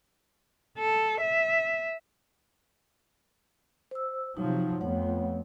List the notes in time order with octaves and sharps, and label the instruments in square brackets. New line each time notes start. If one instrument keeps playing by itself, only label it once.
[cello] A4
E5
[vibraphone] C5 E6
[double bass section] C3 F3 F#3 [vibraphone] D#4
[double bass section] F2 B3 [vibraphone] A3 C#5 F#5